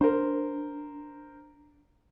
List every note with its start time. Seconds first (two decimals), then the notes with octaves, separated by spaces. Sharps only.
0.01 D4 A#4 C5